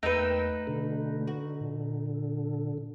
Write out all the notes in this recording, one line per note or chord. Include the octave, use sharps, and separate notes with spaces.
E2 A3 A#3 D#4 B4 G5 E6
B2 D3
F#4
A#2